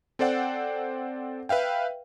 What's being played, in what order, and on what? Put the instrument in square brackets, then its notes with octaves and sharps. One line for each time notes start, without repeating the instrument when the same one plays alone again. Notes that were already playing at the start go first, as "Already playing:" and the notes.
[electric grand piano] C4 A4 C5 D5 F#5 G5
B4 E5 F5 G5